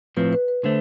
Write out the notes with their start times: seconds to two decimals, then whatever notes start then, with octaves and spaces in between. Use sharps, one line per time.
0.17 A2 F3 C4 B4
0.33 B4
0.48 B4
0.64 D3 A3 C5